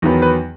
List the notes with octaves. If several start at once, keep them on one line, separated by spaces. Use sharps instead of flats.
E2 D#3 F#3 B3
B4